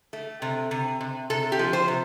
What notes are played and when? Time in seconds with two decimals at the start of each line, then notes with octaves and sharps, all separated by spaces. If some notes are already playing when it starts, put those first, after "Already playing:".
0.13 A3
0.42 C3
0.71 C3
1.01 C3
1.30 C3 A4
1.52 G4
1.59 F3
1.73 C5
1.88 C3